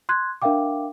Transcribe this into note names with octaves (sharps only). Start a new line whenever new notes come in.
C6 F#6 G#6
D4 A#4 E5 F5 G5 D6